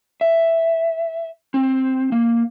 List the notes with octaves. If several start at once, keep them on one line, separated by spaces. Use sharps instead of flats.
E5
C4
A#3